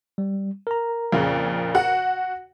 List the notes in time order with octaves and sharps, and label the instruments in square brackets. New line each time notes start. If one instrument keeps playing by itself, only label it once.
[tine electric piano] G3
A#4 A#5
[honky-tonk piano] F2 A#2 C#3
F#4 F#5